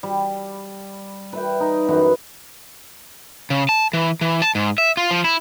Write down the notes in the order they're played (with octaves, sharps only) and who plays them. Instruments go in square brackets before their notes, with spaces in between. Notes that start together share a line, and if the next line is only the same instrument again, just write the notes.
[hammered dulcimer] G3
B4 E5 G5
D#4
F#2 E3 B4 F#5
[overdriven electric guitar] C#3
A5
E3
E3
A5
G#2
E5
F4
F3
E4